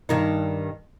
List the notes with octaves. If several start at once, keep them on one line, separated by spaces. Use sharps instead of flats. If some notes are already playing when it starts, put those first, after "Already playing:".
G2 D#3 D#4